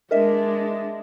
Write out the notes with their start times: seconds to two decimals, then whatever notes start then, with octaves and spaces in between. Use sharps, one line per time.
0.11 G#3 D4 A#4 D#5 E5